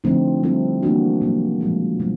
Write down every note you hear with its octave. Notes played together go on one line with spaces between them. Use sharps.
D3 F3 A3 C4 D#4
G3 C4 E4 A4
E3 G3 A#3 D4 F#4
B2 F#3 A#3
A#2 F3 G#3
B2 F#3 A3